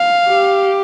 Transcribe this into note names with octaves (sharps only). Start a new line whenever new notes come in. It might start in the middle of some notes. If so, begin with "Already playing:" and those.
Already playing: F5
G4